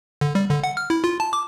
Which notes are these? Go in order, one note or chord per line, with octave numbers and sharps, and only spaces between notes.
D3
G3
D3
F#5
F6
E4
F4
A5
D6